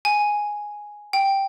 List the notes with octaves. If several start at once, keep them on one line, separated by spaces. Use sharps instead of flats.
G#5
G5